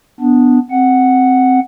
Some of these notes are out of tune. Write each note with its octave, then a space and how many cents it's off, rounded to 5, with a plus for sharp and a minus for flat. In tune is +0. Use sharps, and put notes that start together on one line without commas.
B3 +5 D4 +0
C4 +0 F#5 +0